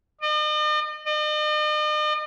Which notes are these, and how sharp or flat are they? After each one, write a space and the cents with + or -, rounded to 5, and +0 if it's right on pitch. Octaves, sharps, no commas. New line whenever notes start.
D#5 -45
D#5 -45